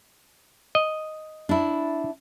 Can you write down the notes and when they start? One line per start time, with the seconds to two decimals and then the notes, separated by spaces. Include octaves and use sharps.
0.75 D#5
1.49 D4 E4